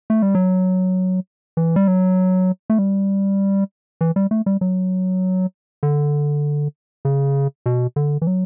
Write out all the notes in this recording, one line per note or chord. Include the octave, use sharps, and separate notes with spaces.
A3
G3
F#3
E3
G3
F#3
A3
G3
E3
G3
A3
G3
F#3
D3
C#3
B2
D3
E3
F#3